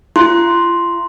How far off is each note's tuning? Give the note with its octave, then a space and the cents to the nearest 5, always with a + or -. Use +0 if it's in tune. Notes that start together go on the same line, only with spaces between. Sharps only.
F4 -40 C6 +0